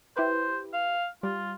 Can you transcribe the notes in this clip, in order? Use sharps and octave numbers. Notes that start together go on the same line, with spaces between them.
E4 G4 B4 C5
F5
G3 F4